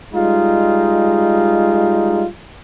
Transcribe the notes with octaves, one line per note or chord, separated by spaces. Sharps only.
G3 G#3 D#4 F4